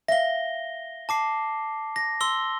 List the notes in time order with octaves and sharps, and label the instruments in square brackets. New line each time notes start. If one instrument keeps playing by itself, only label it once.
[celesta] E5 F5 [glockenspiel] A#6 G7
[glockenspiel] A5 D6 C7
A#6
C6 E6 G7